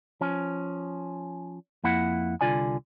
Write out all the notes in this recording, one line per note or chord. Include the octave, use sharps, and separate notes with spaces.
F3 C#4
F2 A#3 E4 F#5
C2 D3 F4 D5 G#5